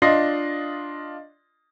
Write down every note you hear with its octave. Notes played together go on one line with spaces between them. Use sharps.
D4 F4 D#5 C6 A#6 C7